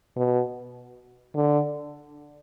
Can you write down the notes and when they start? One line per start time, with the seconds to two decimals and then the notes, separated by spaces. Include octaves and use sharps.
0.17 B2
1.35 D3